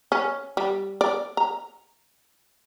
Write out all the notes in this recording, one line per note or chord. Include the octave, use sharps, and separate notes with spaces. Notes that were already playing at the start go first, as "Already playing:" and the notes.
C#4
G3
D5
A#5